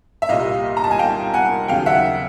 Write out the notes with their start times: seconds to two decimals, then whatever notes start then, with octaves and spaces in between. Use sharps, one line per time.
0.22 E5
0.29 C2 A#2 G3 D#5 F5
0.77 A#5
0.84 A5
0.91 G#5
0.99 F5 G5
1.34 F#5 G#5
1.68 D#2 C#3 F#3 F5 G5
1.86 E5 F#5